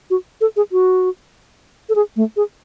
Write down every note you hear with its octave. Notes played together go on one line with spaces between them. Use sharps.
F#4
A4
G#4
F#4
A4
G#4
A3
G#4